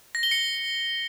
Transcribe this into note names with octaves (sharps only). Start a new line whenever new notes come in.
A#6
G7
C#7